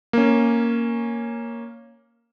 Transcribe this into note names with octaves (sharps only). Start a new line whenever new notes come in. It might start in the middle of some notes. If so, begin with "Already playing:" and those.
A#3 C#4